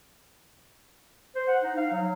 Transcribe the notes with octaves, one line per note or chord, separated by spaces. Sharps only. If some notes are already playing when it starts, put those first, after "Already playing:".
C5
F#5
D#4
F5
F#3